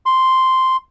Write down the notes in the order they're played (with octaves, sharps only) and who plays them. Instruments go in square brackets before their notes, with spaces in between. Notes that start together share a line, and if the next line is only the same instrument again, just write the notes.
[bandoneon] C6